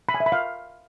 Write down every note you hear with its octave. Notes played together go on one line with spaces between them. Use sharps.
B5
G#5
E5
B5
F5